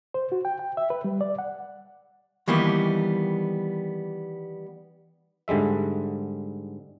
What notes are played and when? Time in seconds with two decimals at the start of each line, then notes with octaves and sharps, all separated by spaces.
0.14 C5
0.32 F#4
0.45 G5
0.59 G5
0.77 E5
0.90 B4
1.04 G3
1.21 D5
1.39 F#5
2.48 D#3 E3 G3 A#3 B3
5.48 G#2 D3 G3 G#3 E5